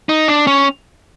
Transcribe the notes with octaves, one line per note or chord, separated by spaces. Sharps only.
D#4
D4
C#4